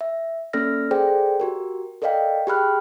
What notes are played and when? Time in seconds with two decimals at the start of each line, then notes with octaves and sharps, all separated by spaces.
0.01 E5
0.53 A#3 C#4 A4 D5 F6 A#6
0.91 G#4 A4 C5 D5 G5
1.40 F#4 G4 A#4
2.02 A4 A#4 D5 D#5 F5 G5
2.47 G4 G#4 G5 B5 F6 F#6